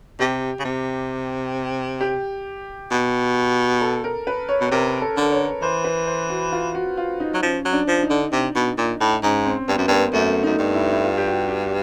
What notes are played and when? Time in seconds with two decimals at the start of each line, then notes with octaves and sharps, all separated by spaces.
0.20 C3 G4
0.59 C#3
0.65 C3
2.01 G4
2.91 B2
3.81 A4
4.04 A#4
4.27 B4
4.49 C#5
4.61 B2
4.71 C3 A#4
5.02 A4
5.17 D3
5.32 C#5
5.62 E3 C5
5.84 B4
6.07 C5
6.29 F#4
6.52 F4
6.75 F#4
6.97 F4
7.20 D#4
7.34 F#3
7.43 F3 C#4
7.65 F#3
7.73 D4
7.88 F3
8.03 D#4
8.10 D3
8.32 C3
8.55 B2
8.78 A#2
9.01 A2
9.23 G#2 C#4
9.45 C4
9.68 G2 B3
9.78 F#2
9.87 G2 A#3 B3
10.13 F#2 A3
10.43 F#2 D#4
10.58 G2
10.74 E4
10.93 E4
11.04 F4
11.18 G4
11.27 F#4
11.48 G4